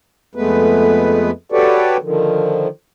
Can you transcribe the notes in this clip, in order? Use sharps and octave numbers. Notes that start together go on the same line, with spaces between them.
F2 G#3 A3 B3 B4
F#4 G4 A4 B4 C#5 D5
D3 D#3 F3